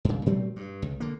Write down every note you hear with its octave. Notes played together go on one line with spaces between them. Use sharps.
G2 C#3
A#2 F#3 A3 C4
G2
C#2
D3 A#3